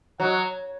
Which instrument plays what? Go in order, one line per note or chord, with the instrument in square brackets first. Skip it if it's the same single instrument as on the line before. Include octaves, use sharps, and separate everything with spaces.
[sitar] F#3 [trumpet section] F#4 D#5 F#5